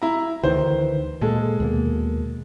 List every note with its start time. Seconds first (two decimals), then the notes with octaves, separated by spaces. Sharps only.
0.02 E4 A#5
0.43 D2 D#3 E3 C5
1.21 A#2 G#3 A4
1.60 D#2 B2 A#3